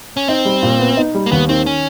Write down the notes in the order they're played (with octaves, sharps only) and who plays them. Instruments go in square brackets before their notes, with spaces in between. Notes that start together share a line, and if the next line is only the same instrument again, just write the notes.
[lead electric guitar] C#4
[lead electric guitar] C4 [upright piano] D#4
[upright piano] G3
A#2
B3
D#4
G3
[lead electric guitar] A#3
[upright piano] D#2 [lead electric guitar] B3
[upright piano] D#3 [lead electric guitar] C4
[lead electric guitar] C#4